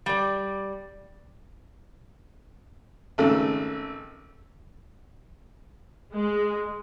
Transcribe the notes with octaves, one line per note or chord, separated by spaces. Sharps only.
G3 D5
G#1 C#3 A3 A4
G#3